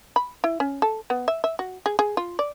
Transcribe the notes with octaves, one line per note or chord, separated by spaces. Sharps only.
B5
E4
C#4
A4
B3
E5
E5
F#4
G#4
G#4
F4
D5